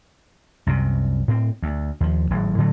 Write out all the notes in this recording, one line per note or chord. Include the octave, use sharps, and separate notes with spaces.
C2 F#2 C3
A2 C4
D2
D#2 F3
G#1 A2 F#3
A2 D3 F#3 A3